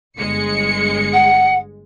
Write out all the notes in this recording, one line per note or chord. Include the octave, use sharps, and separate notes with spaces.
G1 G#3 C#7
F#5